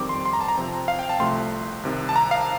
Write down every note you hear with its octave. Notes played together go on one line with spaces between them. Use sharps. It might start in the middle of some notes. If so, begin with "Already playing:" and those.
Already playing: F2 D#3 G3 C4 D6
C6
C6
A#5
A5
A#5
C3 F3 C4
F5
G5
A5
C2 C3 F3 A3 C6
C2 C3 D#3
A5
A#5
F5